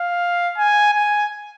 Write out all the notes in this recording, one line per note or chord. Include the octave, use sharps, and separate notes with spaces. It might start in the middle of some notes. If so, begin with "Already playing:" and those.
Already playing: F5
G#5
G#5